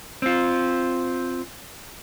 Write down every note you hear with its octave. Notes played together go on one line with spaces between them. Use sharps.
C4 F4